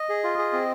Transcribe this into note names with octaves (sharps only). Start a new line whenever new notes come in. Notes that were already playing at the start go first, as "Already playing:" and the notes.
Already playing: D#5
G#4
F4
G#4
C4